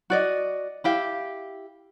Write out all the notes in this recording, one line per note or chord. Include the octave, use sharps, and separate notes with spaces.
F#4 D5 D#5
E4 G4 F5